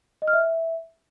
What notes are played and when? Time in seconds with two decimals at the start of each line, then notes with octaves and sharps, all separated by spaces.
0.22 D#5
0.28 F6
0.33 E5